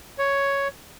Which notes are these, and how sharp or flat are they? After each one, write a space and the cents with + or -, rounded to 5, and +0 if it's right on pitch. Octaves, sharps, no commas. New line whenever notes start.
C#5 +5